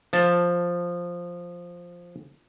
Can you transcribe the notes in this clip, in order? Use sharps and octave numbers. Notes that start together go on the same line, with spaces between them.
F3 A5